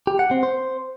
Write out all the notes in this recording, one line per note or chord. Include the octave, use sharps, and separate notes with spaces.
G4
F#5
C4
C5